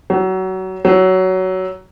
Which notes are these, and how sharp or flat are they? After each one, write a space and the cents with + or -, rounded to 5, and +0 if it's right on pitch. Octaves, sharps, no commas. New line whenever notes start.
F#3 +25
F#3 +15